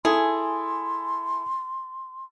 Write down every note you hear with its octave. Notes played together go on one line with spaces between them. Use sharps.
E4 G#4 A4 G#5 C6